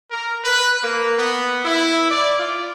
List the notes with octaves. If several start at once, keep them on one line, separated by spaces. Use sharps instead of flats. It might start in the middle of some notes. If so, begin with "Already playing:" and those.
A#4
B4
A#3
B3
E4
D5
F4